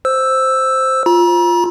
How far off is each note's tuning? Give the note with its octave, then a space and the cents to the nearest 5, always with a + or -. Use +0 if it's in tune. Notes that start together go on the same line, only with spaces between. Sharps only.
C5 +0 E6 +0
F4 +0 A#5 +40